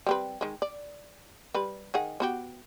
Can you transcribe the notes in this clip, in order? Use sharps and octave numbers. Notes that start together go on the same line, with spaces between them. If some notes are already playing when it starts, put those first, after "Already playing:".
G3 C4 B4
D#3 G#3
D5
G3 B4
D#3 G#4 F#5
B3 F#4 G4